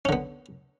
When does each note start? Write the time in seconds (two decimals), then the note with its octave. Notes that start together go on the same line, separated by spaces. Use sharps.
0.05 C#4
0.09 D3
0.12 B3